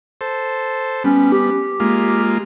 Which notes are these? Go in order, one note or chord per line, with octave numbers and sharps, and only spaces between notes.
A4 C5
G3 B3 C#4
G4
G#3 A#3 F4